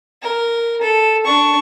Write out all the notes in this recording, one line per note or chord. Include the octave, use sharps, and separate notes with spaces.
A#4
A4
D4 C#6